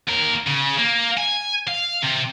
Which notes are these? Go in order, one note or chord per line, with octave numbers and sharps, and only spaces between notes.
D#2 A#4
C#3
A#3
G#5
F5
C3